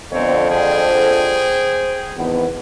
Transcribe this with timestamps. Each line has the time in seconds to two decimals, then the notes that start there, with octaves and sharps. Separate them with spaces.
0.12 F2 D3 B3 C4 C#5
0.49 G#4 C5 G5
2.16 G#1 E2 B3